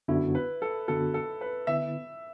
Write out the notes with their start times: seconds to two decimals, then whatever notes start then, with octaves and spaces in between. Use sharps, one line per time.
0.08 F#2 D3 B3 D4 E4 F#4
0.35 B4
0.62 A4
0.88 F#2 D3 B3 D4 F#4 A4
1.14 A4
1.41 B4
1.67 D3 B3 E4 B4 E5